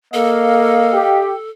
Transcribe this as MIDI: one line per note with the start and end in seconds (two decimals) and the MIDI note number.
0.14 1.01 58
0.14 1.50 69
0.14 1.22 75
0.14 1.22 77
0.92 1.31 67